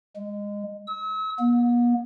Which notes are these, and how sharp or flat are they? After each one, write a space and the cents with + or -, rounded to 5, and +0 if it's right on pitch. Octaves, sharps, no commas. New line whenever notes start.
G#3 -20
E6 -40
B3 -45